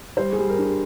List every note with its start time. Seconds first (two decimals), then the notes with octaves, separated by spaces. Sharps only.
0.17 G3 C5
0.33 G#4
0.38 G3
0.49 A#4
0.58 D4
0.65 G#4